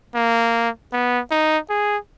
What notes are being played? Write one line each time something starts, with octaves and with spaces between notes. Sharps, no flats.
A#3
B3
D#4
G#4